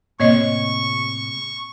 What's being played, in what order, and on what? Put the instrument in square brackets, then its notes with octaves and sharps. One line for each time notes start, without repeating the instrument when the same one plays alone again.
[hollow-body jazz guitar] A2 C3 [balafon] A#3 C#5 D#5 [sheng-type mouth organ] C#6